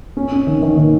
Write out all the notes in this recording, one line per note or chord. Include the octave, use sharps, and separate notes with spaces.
C#4
C#4
D#3
D#3
D#3